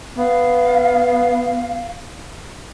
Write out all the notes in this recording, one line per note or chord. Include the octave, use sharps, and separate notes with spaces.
B3 F5